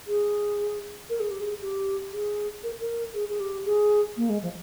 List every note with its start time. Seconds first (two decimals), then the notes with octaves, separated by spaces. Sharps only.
0.07 G#4
1.09 A#4
1.20 G#4
1.30 G4
1.40 G#4
1.61 G4
2.12 G#4
2.63 A#4
2.80 A#4
3.14 G#4
3.28 G#4
3.40 G4
3.65 G#4
4.17 A#3
4.29 G#3
4.42 F3